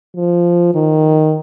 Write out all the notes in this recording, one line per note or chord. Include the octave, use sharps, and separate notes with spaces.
F3
D#3